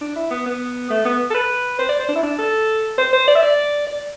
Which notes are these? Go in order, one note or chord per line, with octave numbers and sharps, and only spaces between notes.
D4
E4
B3
B3
A3
B3
A4
B4
C5
D5
C5
D4
E4
D4
A4
C5
C5
D5
E5
D5
D5